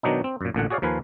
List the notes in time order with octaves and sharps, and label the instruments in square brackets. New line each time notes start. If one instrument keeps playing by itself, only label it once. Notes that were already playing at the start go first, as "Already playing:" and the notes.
[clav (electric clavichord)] B2 D#3 F#3 D4 D#4
C4
F#2 A#2
A1 A#2 D3 F#5
F#4 G#4 C#5 D5 F5
D#2 F3 A#4 B4 F5 G#5